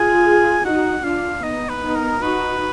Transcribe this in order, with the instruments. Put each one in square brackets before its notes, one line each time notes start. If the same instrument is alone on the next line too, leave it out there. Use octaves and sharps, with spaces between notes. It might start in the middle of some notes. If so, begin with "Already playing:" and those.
Already playing: [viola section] F4 G#4 [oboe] G#5
[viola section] D#4 F#4 [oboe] F#5
[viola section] D4 F4 [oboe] F5
[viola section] B3 D#4 [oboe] D#5
[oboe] B4
[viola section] B3 D#4
[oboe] A#4
[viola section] D#4 F#4 [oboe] B4